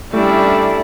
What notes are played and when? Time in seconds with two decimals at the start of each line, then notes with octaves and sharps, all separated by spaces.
0.13 G3 A3 C#4 D4 E4